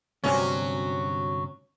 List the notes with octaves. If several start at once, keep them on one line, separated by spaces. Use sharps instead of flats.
D2 G2 C3 F#3 C#4